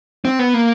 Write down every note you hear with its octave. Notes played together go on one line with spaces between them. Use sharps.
C4
B3
A#3